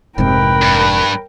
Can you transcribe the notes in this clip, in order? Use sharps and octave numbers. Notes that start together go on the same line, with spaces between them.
F1 G#2 C3 A#4 B4 G5
G2